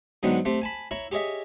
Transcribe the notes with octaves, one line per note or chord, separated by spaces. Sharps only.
G#2 D3 F#3 B3 D#4 G5
A3 C4 G4
G#5 A5 B5
E4 C#5 A#5
G4 G#4 C#5 D#5 E5